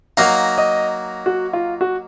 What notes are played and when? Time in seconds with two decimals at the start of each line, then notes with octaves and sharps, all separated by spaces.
0.17 F#3 A#3 D#4 F5
0.58 D#5
1.26 F#4
1.53 F4
1.81 F#4